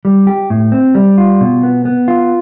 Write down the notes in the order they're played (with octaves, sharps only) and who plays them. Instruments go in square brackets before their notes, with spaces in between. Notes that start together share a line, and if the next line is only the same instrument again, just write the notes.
[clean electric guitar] G3
G4
A2
C4
G3
F4
B2
B3
B3
F4